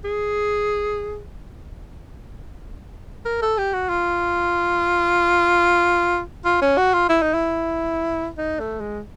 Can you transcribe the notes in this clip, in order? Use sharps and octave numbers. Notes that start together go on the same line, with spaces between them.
G#4
A#4
A4
G4
F#4
F4
F4
C#4
F#4
F4
E4
D#4
E4
D#4
A3
G#3